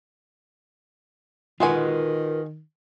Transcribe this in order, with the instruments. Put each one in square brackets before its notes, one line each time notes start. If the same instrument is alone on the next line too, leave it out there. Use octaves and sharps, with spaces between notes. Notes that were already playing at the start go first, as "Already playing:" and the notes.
[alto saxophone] D#3 [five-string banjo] G#3 F#4 G#5 [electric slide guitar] F4 A#4 B4